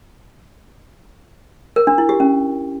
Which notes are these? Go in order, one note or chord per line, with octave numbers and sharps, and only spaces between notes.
A#4
D4
E4
G4
C#4